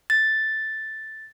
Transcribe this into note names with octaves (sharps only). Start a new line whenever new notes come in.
A6